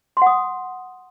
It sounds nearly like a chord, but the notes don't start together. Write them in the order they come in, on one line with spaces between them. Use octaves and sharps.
C6 F#5 D#6